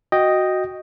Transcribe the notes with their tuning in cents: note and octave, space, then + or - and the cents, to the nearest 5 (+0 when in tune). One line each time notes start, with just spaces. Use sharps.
F#4 +0 D#5 +0 G5 +0